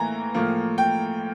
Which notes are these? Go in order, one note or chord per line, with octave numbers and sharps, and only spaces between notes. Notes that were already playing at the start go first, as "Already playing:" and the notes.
Already playing: A2 E3 A#3 A#5
A2 F3 A#3
G5